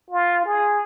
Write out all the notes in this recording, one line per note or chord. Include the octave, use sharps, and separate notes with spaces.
F4
G#4